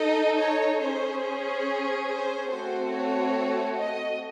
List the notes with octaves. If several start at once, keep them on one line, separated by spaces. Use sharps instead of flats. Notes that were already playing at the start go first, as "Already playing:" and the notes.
Already playing: D#4 A4 D#5
C#5
C#4 G#4 C5
C5
C5
A3 C4 F#4 A4 C5
C#5
D#5